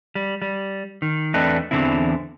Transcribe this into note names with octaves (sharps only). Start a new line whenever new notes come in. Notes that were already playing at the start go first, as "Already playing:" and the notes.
G3
G3
D#3
E2 A3 C4 D4 B4 D#5
E2 G#2 D3 E3 C4 E4